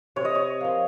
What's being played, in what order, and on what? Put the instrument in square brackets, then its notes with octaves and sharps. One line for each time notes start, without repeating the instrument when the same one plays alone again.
[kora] C3 [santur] C#5
[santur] D#5
C#5
[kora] F3 A#3